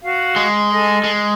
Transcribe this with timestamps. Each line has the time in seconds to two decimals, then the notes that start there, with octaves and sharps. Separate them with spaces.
0.04 F#4 F5
0.36 G#3
0.71 A4 D#5 G#5
1.04 G#3